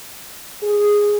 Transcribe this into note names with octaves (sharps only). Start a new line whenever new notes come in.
G#4